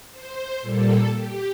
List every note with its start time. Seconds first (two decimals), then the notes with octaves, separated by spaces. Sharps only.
0.12 C5
0.62 A#2 G3 A#3 A4
1.13 G4